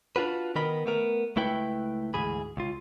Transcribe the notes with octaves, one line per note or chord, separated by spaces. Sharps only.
D4 F4 F#4 B4
D#3 B3 A#4 D#5 B5
A3 B3 A#4
C#2 A3 E4 B4 G5
D2 G#2 E3 G#4 B5
C#2 F4